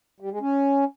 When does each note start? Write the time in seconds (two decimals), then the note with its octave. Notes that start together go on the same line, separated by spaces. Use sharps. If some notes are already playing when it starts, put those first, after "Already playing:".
0.20 G3
0.31 G#3
0.41 C#4